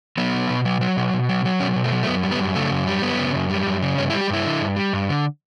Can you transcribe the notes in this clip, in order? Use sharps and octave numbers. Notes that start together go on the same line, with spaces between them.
F#3 B3
B2
B2
F#3
F#3
B2
B2
F#3
F#3
B2 C#4
B2
A3
F#3
A3
F#2 B3
G3
B3
F#2
C#3 A3
F#2
G3
F#2 B3
C#3
F#2
G3
F#2
C#3
G2 C#4
E4
G3
G4
G2 E4
D3
G2
G3
G2
D3